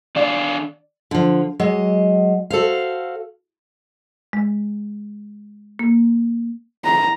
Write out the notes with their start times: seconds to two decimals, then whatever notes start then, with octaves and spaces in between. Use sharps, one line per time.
0.16 D#3 D4 D5 F5
1.11 D3 F3
1.60 F#3 G#3 D#5
2.50 F#4 A4 C5 F5
4.33 G#3
5.79 A#3
6.85 A#5